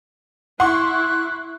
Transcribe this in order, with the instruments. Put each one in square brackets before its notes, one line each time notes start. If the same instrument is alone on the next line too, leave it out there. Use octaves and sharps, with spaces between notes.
[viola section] E4 [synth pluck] F#5 [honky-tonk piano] C6 C#6 [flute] F#6